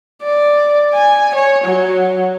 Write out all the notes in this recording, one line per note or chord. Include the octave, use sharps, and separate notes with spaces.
D5
G#5
C#5
F#3